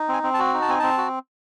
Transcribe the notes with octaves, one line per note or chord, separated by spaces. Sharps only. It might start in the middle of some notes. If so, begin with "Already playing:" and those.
Already playing: D#4
C4 G#5
C4
A5
F#4
D#4
A5
C4 G#5
C4 A5
F#4